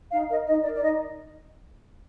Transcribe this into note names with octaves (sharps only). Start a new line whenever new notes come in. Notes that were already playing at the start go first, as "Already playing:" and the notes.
D#4 F5
A#4 D#5
D#4 D#5
A#4 D5
D5
D#4 D#5